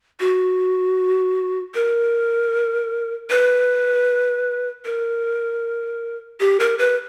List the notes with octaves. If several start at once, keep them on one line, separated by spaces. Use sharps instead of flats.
F#4
A#4
B4
A#4
G4
A#4
B4